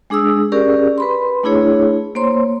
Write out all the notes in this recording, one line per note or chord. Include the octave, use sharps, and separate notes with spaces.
G#3 D4 G#4 D#6 E6
C#4 G4 G#4 A#4 D5
B4 B5 C6
A3 D4 E4 G#4 C#5
A#3 C5 C#5 C6